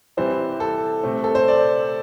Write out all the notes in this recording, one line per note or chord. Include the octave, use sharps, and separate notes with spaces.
C3 E3 G3 C4 C5
A4
C3 A3 C4
A4
C5
D5